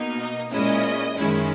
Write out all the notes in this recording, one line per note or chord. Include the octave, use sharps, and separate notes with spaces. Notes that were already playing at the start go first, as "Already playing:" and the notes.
Already playing: B2 A#3 D#4
D#5
A#2 G#3 C#4 E4 D#5
F#2 D#3 G#3 C#4 E4